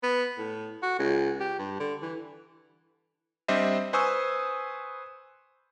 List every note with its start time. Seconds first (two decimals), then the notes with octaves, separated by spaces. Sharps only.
0.03 B3
0.38 A2
0.82 F#4
0.99 C#2
1.40 G4
1.59 G2
1.80 D3
2.02 E3
3.48 G3 C4 D4 C5 D#5 E5
3.93 B4 C5 G#5 C#6 D#6 E6